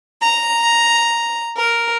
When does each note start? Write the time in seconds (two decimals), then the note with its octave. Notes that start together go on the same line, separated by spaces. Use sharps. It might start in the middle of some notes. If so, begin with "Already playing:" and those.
0.22 A#5
1.57 A#4